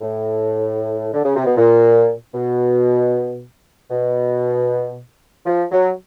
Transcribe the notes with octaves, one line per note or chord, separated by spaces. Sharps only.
A2
D3
C#3
C3
B2
A#2
B2
B2
F3
F#3